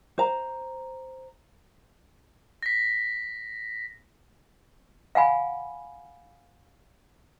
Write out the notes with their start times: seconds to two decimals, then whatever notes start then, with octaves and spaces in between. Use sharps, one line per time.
0.18 C5 A#5
2.63 A#6 B6
5.15 F5 F#5 G#5 B5